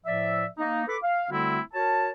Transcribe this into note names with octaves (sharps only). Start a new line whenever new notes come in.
A2 F3 D5 E5
A#3 D#4
A4 B4 B5 D6
F5
D3 G3 A3 C4 E4 F#4
F#4 A#4 C#5 A5